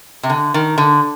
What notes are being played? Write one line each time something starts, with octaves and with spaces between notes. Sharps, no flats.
C3
D3
D#3
D3